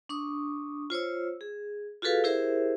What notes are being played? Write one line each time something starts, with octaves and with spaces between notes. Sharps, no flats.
D4 C#6 D#6
F4 C5 C#5 E6
G#4
F4 F#4 G#4 A4 B4 F5
E4 G4 G#4 A#4 C5 E5